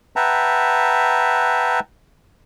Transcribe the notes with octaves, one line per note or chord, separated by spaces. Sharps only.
B4 E5 F#5 G5 A5 A#5